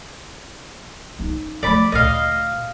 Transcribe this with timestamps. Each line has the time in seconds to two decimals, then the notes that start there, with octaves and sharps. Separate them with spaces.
1.19 C#4 D#4
1.63 F3 A3 D5 B5
1.92 D2 A#2 D#5 F5